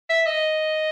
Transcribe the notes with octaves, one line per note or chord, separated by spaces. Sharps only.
E5
D#5